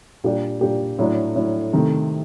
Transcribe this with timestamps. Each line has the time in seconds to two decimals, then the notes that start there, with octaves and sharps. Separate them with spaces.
0.24 A#2 G3 D4 G4
0.61 A#2 G3 D4 G4
0.99 A2 F#3 A3 D4
1.36 A2 F#3 A3 D4
1.73 C3 D#3 A3